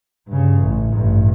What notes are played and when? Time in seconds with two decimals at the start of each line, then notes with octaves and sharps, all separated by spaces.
0.28 G2 C#3
0.59 A1
0.92 A1 G2